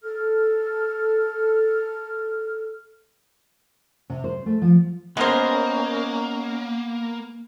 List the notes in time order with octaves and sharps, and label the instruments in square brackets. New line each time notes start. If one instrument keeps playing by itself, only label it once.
[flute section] A4 F6
[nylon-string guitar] C3
C5
A3
F3
[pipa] G#3 C5 [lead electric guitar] A#3 [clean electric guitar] B3 G#4 A#4 [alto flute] C#4